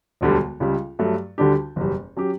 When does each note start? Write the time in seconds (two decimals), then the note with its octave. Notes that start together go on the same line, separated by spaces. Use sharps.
0.21 E1 D2 D3 G3
0.60 C#2 C#3 G3
0.99 G2 F#3 A3
1.38 D2 D3 G3 D4 G4
1.76 F#1 E2 B2 G3
2.17 F#3 C#4 G4